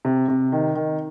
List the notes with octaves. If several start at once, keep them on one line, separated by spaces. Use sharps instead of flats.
C3
C3
D#3
D#3